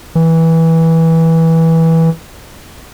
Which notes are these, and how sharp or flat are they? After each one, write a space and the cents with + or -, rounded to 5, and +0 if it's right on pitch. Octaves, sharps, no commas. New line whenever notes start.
E3 -15